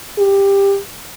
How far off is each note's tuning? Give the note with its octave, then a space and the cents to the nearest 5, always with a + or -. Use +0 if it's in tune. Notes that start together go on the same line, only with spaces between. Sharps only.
G4 +15